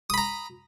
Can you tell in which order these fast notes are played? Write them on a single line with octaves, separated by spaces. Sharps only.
D#6 B5 A#5